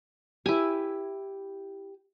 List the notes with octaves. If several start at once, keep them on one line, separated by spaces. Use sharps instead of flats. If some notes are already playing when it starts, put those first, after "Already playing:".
E4 G4 B4 G#5